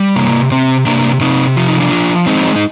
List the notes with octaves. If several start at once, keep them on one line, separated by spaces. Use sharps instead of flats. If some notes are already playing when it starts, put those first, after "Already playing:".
Already playing: G3
C3 A#3
C3 C4
C3 A#3 D4
C3 C4 D#4
F3 F4
D#4
D4 F4
F3
G#3 C4 D#4
D#4